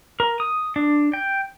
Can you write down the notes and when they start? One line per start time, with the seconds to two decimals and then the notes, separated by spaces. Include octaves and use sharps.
0.20 A#4
0.40 D#6
0.76 D4
1.13 G5